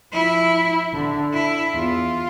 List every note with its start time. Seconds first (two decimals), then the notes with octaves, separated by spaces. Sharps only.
0.12 F3 E4
0.93 D3
1.33 E4
1.74 E2 F4